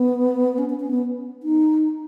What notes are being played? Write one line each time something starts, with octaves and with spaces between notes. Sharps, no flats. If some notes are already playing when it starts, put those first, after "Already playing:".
Already playing: B3
C#4
C#4
C#4
B3
D#4